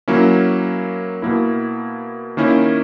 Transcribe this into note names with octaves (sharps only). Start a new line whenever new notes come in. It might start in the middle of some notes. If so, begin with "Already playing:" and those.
F#3 A#3 C#4 E4
B2 A#3 E4
D#3 A#3 C#4 E4